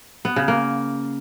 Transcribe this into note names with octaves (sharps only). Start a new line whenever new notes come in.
B3
C#3
A#3